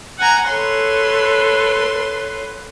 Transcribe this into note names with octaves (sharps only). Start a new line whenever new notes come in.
F#5 G#5 A#5
A4 B4 C#5 C6